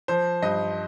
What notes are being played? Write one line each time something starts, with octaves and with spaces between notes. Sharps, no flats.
F3 C5
G2 D#5